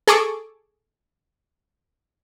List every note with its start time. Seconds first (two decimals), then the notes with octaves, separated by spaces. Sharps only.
0.08 G#4 A4 C#6 D6